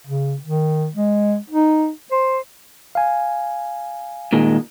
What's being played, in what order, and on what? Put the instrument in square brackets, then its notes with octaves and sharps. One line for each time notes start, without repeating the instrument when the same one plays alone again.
[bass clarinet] C#3
D#3
G#3
D#4
C5
[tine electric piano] F5 G#5
[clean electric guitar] A#2 D#3 G#3